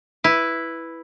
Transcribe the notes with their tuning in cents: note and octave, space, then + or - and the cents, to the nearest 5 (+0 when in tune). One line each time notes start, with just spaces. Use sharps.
E4 +0 B4 +0